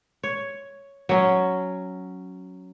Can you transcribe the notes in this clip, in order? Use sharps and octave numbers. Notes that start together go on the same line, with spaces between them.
C#5
F#3 C#4